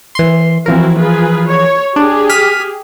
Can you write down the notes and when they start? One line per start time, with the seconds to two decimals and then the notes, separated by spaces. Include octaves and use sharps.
0.15 E3 C6
0.66 E3 F3 C4 E4 F#4 A#4
0.98 F4 G#4 B4
1.49 C#5
1.96 D4 G4 G#4
2.29 F6 B6 D#7